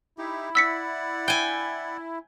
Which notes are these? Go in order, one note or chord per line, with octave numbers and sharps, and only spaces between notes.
D#4 E4 G4
D5 F#5 E6 B6 C#7
G5 G#5